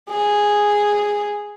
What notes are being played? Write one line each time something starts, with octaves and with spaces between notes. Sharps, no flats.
G#4